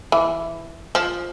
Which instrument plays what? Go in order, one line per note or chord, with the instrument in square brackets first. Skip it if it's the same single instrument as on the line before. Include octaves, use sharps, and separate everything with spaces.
[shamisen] E3
F3